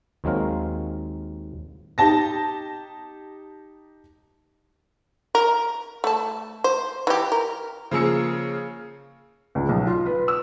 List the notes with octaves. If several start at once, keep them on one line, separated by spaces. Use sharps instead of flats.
D#2 F#3 G#3 C4 A#4 F5
D#4 G4 A5 A#6
A#4
A3 A5
C5
E3 G4
A#4
C#3 F3 A#3 G#4 E6 C#7
C#2
B1
F4
B4
E6